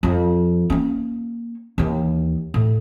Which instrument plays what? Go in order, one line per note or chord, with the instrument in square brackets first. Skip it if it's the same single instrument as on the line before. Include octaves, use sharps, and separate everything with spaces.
[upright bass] F2 F3
A#3 C#4
D#2 E3
A2